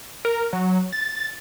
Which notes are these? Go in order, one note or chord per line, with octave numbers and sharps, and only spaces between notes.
A#4
F#3
A6